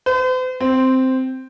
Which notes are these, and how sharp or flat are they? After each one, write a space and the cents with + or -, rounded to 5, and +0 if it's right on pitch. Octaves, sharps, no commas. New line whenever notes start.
C5 -45
C4 -5